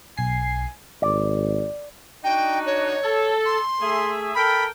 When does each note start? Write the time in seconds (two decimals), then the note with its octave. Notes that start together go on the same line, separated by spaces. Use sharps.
0.18 B1 G#5 C7
1.02 G#1 D5
2.24 D4 D#4 F#4 G5
2.66 C#5
3.02 A4
3.46 C6
3.80 A3 G#4 E5
4.35 A4 A#4 G5 B5